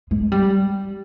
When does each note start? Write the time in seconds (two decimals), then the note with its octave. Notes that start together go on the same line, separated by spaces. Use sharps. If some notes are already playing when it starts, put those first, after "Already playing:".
0.11 G#3
0.32 G3